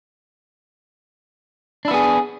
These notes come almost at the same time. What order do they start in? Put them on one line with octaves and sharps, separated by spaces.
D4 E4 B3 G#4